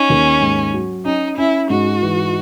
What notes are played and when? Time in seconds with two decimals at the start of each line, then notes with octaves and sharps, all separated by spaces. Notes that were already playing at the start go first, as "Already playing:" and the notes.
Already playing: C#4 D#4
0.10 D#2
0.41 G#2
0.74 F#3
1.05 C#4 D#4
1.38 C#4 E4
1.70 G#2 F#4
2.02 E3